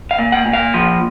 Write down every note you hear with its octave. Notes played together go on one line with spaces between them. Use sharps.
F5
A#2
F#5
A#2
F5
F3